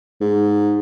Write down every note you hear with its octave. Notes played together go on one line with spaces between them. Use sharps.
G#2